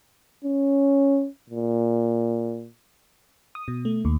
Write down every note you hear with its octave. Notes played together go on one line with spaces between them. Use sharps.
C#4
A#2
D#6
B2
A3
D#2